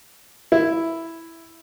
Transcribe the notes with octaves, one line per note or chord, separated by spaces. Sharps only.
E4